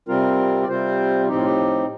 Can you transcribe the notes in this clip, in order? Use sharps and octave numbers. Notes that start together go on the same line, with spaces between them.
C3 G3 C4 F4 A#4
D5
C3 G3 C4 F4 C5
A2 F3 C4 D#4 G4
F4
G4